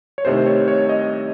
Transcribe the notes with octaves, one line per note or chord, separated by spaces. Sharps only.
C#5
C2 C3 D#3 A3 C4 C5
C#5
C#5
D#5